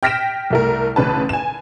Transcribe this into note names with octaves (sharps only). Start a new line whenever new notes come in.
G5 F6 A#6 B6 D7 E7
C2 A3 A#4
A1 C#3 B4 A5
G#5 E7